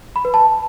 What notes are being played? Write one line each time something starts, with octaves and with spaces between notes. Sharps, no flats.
B5
B4
A5